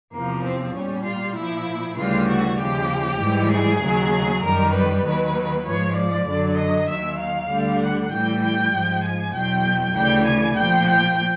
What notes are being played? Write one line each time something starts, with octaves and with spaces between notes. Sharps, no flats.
E2 C3 F3 A#3
C4
A#2 G3 C#4
F4
A#2 F3 E4
D2 C#3 E3 G3 F4
F#4
D#2 C#3 F3 G4
G#2 E3 G3
G#4
D#2 C#3 F#3
F#2 D#3 G3 A#4
B4
D#2 D#3 F#3
G#2 F3 C#5
D5
F#2 D3 F#3
D#5
D#2 D#3 F#3 E5
F5
D2 D3 G3
F#5
A2 E3 G3 G5
G5
G#2 F3
G#5
E2 B2 F#3 G5
D2 C#3 E3 G3 G5
G#5
A#2 F3 G5
G5